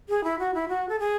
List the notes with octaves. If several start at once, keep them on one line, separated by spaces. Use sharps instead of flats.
G#4
E4
F#4
E4
F#4
A4
G#4